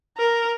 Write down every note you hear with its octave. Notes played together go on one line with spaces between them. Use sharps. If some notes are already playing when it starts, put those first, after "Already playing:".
A#4